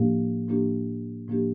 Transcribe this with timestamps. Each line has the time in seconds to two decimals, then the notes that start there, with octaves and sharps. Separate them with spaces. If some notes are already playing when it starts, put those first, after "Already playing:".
Already playing: A2 F3 A#3 D4 G4
0.48 A2 F3 A#3 D4 G4
1.28 A2 F3 A#3 D4 G4